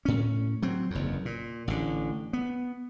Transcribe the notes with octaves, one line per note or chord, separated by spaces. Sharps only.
A2 C#4
F#3 C4
F#1 E2
A#2
A1 D3
B3